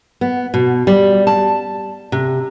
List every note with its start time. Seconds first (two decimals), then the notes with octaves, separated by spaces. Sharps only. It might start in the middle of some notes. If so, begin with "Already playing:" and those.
0.21 B3
0.54 B2
0.87 G3
1.27 A5
2.12 C3